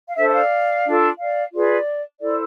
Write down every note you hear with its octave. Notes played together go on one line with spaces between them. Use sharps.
F5
D4 A4 C5 E5
E5
D5 F5
D4 F4 A4
D5 F5
F4 G#4 B4 D5
E4 A4 C5 D5